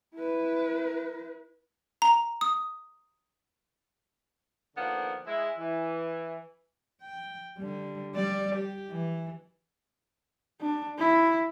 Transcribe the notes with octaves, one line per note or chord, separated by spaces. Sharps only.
E4 B4
A#5
D#6
D3 D#3 F3 A#3 B3
G#3 E4
E3
G5
D3 G3
G3 D5
G4
E3
D4
E4